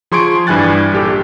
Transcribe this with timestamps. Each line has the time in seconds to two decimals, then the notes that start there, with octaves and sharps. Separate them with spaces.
0.11 F3 G#4 C6 C#6 G#6 D7
0.47 G2 E3 G3 G#5 F#6 A6
0.93 A#1 G4 A4